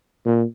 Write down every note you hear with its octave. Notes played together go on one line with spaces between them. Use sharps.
A#2